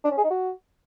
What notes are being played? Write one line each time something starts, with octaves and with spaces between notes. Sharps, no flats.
D4
C#4
G#4
D#4
F#4